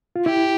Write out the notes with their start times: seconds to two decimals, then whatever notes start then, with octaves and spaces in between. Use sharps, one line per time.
0.16 F4
0.26 E4 G4